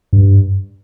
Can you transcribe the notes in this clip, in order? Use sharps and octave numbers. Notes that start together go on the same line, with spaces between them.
G2